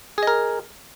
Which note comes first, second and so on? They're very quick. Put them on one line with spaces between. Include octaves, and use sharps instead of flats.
G#4 D#5 A#4